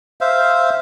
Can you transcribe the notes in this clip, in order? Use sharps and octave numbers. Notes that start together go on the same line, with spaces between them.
C5 E5 F5